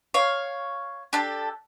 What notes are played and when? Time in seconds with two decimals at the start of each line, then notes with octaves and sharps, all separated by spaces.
0.14 C#5 F5
1.13 D4 G4 A4